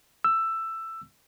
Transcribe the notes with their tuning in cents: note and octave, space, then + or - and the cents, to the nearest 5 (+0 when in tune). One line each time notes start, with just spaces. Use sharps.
E6 +10